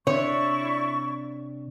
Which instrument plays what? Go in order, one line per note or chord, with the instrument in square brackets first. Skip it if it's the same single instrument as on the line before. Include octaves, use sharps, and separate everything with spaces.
[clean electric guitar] C3 D4 [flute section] E4 D5 C#6 [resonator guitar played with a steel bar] C#5